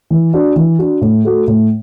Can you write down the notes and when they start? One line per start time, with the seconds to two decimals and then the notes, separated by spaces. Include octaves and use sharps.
0.10 E3
0.34 D4 F#4
0.56 E3
0.79 D4 F#4
1.01 A2
1.25 A3 F#4
1.48 A2